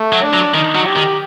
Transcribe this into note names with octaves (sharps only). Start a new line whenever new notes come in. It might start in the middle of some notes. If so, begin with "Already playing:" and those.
Already playing: A3
F#3
D4
F#3
D#3 D#4
F#3
G4
D#3